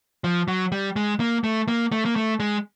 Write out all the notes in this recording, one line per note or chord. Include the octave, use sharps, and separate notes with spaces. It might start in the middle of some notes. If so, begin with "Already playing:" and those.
F3
F#3
G3
G#3
A#3
A3
A#3
A3
A#3
A3
G#3